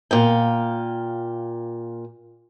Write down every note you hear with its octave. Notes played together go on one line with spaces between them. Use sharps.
A#2 F5 G5